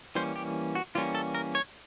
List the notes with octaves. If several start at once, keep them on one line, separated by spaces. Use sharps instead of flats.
E3 G3 A#3 C#4 C5
G4
F#4
E3 G3 A#3 C#4 F4
A4
A#4
C#5